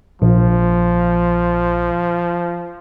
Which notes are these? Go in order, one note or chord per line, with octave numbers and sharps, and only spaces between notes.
A#1 F3